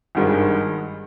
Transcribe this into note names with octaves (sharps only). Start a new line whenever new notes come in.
G#1 G2 D#3 G#3